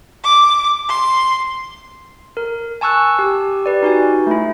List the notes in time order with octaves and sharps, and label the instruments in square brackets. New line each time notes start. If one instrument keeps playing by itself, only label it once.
[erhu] D6
C6
[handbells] A#4
G#5 A5 C#6 E6 F#6
G4
G4 B4 D5
D#4 F#4 G#5
A3 E4